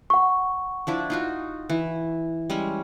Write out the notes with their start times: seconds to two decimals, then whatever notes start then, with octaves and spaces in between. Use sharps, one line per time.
0.10 F#5 C#6
0.87 F3 D4 E4
1.10 D#4 F4 F#4
1.70 E3
2.50 G3 G#3 C#4